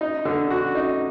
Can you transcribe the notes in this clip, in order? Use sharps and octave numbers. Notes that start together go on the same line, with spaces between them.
D#4
D3
F#4
D#4